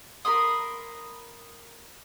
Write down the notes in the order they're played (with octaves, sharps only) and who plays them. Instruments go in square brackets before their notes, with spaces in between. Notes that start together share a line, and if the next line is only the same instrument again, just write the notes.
[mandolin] A#4 B5 C6 D#6